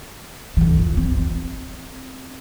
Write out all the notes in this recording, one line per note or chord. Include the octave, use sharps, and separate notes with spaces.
D3 E3
F2
C4